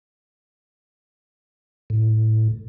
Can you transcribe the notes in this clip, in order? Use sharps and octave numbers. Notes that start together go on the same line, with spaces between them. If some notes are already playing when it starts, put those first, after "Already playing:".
A2